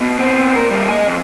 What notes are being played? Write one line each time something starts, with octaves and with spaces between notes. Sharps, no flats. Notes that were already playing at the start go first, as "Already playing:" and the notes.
B2
B3 C4
A#2 A#4
G3 A#3
D#5 G#5
F2